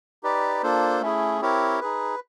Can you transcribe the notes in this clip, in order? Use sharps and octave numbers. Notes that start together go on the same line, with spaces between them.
D#4 G4 B4 D5
A#3 D4 F4 A4 C5
A3 C#4 E4 G#4
C4 E4 G4 A#4 C#5
D#4 G#4 B4